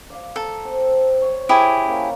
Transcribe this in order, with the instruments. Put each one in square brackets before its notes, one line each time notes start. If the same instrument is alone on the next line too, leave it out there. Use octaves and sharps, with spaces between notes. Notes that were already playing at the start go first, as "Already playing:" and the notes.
[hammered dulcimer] D5 F5
[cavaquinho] A4 [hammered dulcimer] A#5
[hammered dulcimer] C4
C5 C#5
[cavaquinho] E4 G4 G#4
[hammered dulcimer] A#3 C#4